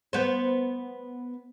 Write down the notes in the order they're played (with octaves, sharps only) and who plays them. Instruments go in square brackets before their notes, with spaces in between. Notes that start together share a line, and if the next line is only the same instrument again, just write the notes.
[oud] B3 C5